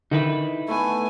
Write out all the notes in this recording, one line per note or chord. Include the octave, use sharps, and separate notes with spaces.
D3 D#3 D#4 E4 B4
A3 B3 G#5